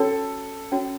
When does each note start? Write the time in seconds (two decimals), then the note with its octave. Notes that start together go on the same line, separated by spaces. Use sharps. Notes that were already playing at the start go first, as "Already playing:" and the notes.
Already playing: C#4 F#4 A4 C#5
0.72 C#4 F#4 C#5